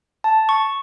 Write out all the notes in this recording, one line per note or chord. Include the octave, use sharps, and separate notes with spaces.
A5
C#6